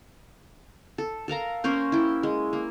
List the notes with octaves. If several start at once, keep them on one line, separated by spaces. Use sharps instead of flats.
A4
A4 A#4 F5 A#5
A#3 C#4 A#4 C5
E4 G5
G#3
A#3